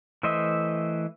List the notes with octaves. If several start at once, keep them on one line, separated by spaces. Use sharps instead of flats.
E3 A3 C5 D#5 E5